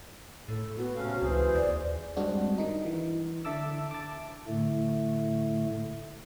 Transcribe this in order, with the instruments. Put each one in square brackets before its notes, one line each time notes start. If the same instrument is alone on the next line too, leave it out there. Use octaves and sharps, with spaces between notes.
[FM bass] A2 [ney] A4
[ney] B3 [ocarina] F#4
[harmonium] C3 C#4 F5 [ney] A3
[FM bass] C#2 [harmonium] E3 G#4 [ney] C5
[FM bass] D#2 [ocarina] D5
[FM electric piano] G2 G#3 C4 D4 F#4
D#3 D#4
E3
D3 E5 A5 D6 E6
A5 D6
[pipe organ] A2 D3 A3